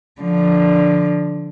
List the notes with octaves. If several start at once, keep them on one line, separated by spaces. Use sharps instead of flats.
D3 F3